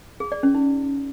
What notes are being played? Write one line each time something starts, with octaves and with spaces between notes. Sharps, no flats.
G#4
D5
C#4
D#4